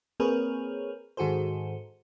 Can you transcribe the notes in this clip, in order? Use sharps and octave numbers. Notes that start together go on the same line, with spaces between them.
A#3 C4 G#4 A#4 B4 C#5
G#2 D#3 F#4 G#4 A4 C5